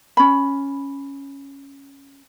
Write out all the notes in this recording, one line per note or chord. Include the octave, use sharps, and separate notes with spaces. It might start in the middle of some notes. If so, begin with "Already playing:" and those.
C#4 B5